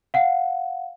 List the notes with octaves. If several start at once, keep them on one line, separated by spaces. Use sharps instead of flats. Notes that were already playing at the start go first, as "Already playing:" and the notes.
F5 F#5